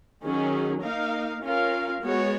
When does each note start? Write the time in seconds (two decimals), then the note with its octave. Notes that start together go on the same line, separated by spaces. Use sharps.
0.25 D#3 F#3 C#4 G#4
0.84 A#3 D#4 A#4 F5
1.43 C#4 F4 A#4 F5
2.02 G#3 B3 F#4 C#5